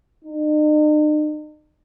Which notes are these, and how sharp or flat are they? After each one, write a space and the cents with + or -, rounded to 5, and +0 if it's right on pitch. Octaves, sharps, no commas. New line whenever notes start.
D#4 -45